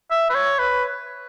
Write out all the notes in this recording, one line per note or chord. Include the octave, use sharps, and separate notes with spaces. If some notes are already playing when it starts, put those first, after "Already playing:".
E5
B4
C#5
B4